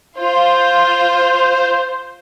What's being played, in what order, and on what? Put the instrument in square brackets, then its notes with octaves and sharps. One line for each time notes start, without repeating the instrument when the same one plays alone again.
[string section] F4 [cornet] C5